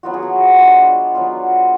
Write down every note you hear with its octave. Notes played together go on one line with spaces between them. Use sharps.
F#3 B3 F4 F#4
G#4
F#4
G#3 D4 F4 C#5
F#3 B3 F4